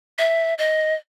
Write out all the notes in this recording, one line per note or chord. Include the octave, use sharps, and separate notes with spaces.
E5
D#5